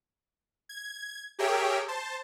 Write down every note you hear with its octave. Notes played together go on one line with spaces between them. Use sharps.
G#6
G4 G#4 A#4 C#5 E5 G5
C5 A5